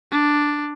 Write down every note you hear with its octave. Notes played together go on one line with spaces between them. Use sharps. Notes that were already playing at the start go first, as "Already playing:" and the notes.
D4